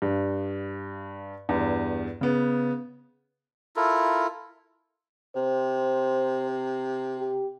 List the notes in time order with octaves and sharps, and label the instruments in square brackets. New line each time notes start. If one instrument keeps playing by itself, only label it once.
[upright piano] G2
E2 G2
C#3 B3
[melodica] E4 F4 A4 A#4
[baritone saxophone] C3 [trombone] C5
[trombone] G4